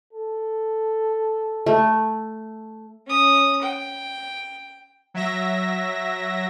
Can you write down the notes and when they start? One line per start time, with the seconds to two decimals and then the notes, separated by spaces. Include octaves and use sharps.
0.13 A4
1.66 A3
3.07 C#4 D#6
3.62 G5
5.14 F#3 E5 A#6